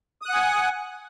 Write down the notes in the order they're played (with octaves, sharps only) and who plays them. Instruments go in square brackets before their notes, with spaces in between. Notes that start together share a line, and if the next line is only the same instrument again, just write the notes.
[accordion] D#6
F#6
F#5
G#5